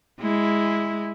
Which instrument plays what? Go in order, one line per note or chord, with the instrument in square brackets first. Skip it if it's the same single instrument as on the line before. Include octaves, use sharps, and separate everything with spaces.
[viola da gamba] G#3 E4